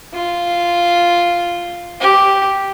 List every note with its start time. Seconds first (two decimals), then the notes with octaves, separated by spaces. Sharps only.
0.15 F4
2.01 G4